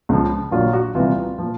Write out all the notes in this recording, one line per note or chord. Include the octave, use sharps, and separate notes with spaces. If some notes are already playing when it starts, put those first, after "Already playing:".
C#2 C#3 F3
A#1 A#2 F#3 F4
F#4
C2 C3 E3 F4
A#2 F3